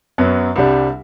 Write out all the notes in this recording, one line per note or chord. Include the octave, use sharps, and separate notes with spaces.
F#2 F#3 B3
C2 C3 G3 D4